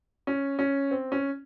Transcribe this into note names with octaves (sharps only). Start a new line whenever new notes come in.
C#4
C#4
C4
C#4